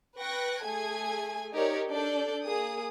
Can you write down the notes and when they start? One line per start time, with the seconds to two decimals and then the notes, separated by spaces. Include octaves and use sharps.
0.19 B4 G5 C#6 F#6 A#6
0.64 A3 G#4 A4 G#5 G#6
1.54 D#4 G4 A#4 C#5 D5
1.91 D4 A4 D5 G6
2.45 A#3 G#4 D#6